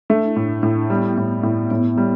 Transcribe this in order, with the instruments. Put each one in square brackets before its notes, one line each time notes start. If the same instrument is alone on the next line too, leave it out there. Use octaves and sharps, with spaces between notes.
[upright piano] A3 [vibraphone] D4
[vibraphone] E4
[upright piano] A2 [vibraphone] D4
[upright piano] A2
[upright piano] G3 [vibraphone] B3
[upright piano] A2
A2
[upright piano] A2 [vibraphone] B3
[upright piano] G3